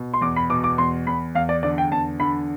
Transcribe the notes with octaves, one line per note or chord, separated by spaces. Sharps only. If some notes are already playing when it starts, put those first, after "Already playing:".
Already playing: B2
C6
E2 D6
B5
B2 D6
D6
E2 C6
E2 B5
E2 F5
D5
D3 D5
G5
E2 A5
D3 B5